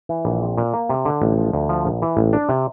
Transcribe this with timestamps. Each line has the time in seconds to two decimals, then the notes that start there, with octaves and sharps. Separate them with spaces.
0.09 E3
0.25 A#1
0.42 C4
0.57 A#2
0.74 A#3
0.89 C3
1.05 D3
1.22 A1
1.38 F3
1.53 D2
1.69 F3
1.85 A#1
2.02 E3
2.17 A1
2.33 D4
2.49 C3